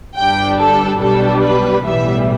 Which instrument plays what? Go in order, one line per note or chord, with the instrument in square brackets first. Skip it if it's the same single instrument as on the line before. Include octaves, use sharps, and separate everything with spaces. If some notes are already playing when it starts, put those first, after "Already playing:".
[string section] G1 G2 G3 D4 G5
A4
B1 B2 G3 D4 A4
B4
B1 A2 E3 G3 B3 E5